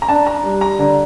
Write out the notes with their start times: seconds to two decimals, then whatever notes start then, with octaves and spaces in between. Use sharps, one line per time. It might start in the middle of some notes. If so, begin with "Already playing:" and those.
0.02 A#5
0.09 D4 A5
0.27 A#5
0.44 G3
0.61 A#5
0.79 D3